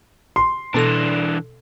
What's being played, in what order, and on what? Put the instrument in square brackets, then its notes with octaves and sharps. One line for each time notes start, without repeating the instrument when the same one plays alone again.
[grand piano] C6
[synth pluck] B2 A4 A#6 [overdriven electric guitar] E3 D4